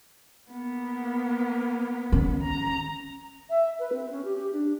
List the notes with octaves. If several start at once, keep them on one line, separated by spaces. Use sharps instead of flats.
A#3 B3
D#3 C#4
A#5
E5
B4
C4
C#4
G4
G4
D4